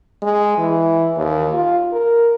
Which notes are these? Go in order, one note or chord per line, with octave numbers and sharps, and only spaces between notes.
G#3
E3
D#2
F4
A#4